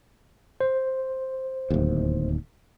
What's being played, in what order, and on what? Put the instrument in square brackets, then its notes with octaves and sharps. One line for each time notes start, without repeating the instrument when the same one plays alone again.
[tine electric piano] C5
[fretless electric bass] D1 D#2